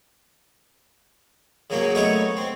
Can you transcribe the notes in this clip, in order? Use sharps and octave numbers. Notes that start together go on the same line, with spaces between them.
C#3 F#3 A#3 C#4
A3 B3 C#4 D#4 C#5 D#5
C4